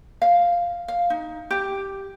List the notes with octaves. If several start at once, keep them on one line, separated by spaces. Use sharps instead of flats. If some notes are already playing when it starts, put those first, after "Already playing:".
F5
F5
D#4
G4